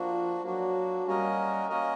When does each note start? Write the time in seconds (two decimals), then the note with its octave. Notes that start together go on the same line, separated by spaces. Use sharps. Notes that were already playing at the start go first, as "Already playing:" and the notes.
Already playing: F3 A#3 D4 F#4
0.44 F#3 A#3 D4 F#4
1.07 G3 A#3 C#4 F#4 A#4 D#5
1.70 A#3 C#4 F#4 A#4 D#5